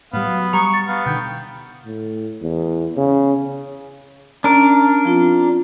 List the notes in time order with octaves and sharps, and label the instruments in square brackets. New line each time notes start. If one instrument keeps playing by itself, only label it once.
[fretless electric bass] A2 G3 [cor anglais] B3 [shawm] F5
[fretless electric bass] F#3
[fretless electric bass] G3 [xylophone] A#5 D#6 [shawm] C#6
[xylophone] A6
[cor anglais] B3 [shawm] F5
[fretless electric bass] B2 D3 D#3 [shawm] G5
[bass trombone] A2
E2
C#3
[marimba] C#4 [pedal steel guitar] D4 A#4
[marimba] F3 C4 F4